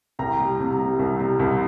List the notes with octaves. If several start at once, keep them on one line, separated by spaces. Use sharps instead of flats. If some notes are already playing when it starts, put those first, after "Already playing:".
C2 G5 A#5
G3
C3
G3
C2
G3
C2